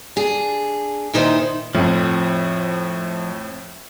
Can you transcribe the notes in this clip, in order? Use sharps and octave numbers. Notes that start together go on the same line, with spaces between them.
D4 G#4
A#2 D#3 D#4 E4 B4 C5
F2 A2 F3